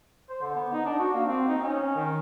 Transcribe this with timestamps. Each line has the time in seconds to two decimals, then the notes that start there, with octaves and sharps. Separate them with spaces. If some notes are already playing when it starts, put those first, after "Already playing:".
0.30 C5
0.42 D3
0.55 B3
0.73 D#4
0.85 D4
0.99 F#4
1.13 A#3
1.27 C4
1.48 D#4
1.62 C#4
1.96 D#3